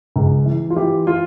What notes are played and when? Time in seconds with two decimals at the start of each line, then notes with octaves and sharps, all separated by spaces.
0.16 C#2
0.46 E3
0.70 F4
0.76 E3 G4
1.07 F4